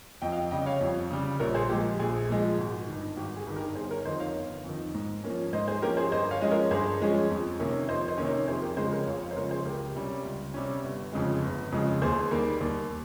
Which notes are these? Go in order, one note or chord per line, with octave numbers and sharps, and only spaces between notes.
F2 D#5 G5
F5
D#5 G5
C#3 G3 D#5 G5
C#5 F5
F2
C#3 G3
A#1 A#4 C#5
G#4 C5
A#2 F3 G#3 G4
A#1 G#4
A#2 F3 G#3
G#1
G2 D#3
G#1 G4
G#4
G2 D#3
G4 A#4
G1 G#4 C5
A#4 C#5
F2 D#3 C5 D#5
C#5 F5
G1
F2 D#3
G#2
F3 A#3 C#4
G#2 C5 D#5
G#4 C5
F3 A#3 C#4 G4 A#4
G#4 C5
G2 C5 D#5
C#5 F5
F3 G#3 C#4 D#5
A#4 C#5
G2 G#4 C5
F3 G#3 C#4
F2
C3 D#3 A#3 C#4
F2 C5 D#5
C5 D#5
C3 D#3 A#3 C#4
A#4 C#5
F2 G#4 C5
G4 A#4
C#3 F3 G#3 G#4 C5
A#4 C#5
F2 C#5 F5
C#5 F5
C5
C#3 F3 G#3 A#4 C#5
G#4 C5
C#2 G4 A#4
C3 G3 C#4
C#2
C3 G3 C#4
G1
F2 C#3 G#3
G1
F2 C#3 G#3
D#2 G#4 C5
D#3 G3 A#3
D#2